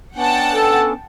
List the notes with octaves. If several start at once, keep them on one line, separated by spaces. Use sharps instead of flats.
B3 C#4 D4 F#5 G5 A5
A4